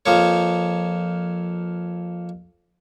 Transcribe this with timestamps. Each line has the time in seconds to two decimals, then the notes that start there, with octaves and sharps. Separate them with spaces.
0.06 F2 F3 A#3 C#5